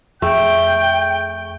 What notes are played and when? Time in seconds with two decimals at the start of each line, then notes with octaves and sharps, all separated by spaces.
0.22 F2 A3 G#4 G5 C#6 G6